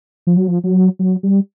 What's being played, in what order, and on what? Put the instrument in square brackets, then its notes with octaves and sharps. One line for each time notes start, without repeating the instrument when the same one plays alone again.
[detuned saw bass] F3
F#3
F3
F#3
F#3
G3